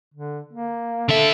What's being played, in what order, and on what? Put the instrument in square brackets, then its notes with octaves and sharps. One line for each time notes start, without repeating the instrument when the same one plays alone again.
[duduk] D3
A#3
[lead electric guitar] D3 E5 [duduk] A4